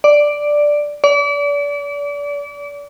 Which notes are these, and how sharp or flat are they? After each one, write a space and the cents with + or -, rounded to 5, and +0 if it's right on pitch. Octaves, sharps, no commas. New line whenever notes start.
D5 +0
D5 -35